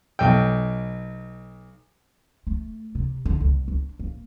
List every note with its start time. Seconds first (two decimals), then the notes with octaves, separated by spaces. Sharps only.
0.19 B1 G5
2.47 A3
2.95 C3
3.26 D3
3.40 C2
3.68 D4
3.99 A#3